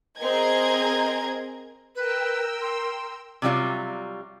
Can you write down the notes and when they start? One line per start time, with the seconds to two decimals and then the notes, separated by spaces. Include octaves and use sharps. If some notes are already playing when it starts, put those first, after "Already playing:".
0.18 C4 G#4 A#4 D#5 A#5 G#6
1.95 A#4 B4 G5 E6
2.61 C6
3.42 C3 F#3 G3 F4